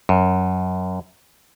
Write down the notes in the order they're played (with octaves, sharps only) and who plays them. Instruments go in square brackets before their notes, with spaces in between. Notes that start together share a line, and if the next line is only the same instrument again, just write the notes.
[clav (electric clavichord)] F#2